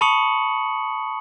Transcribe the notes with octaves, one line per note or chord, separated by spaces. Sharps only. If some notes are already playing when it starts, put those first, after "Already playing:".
A5 B5 C#6 D#6 C#7 F#7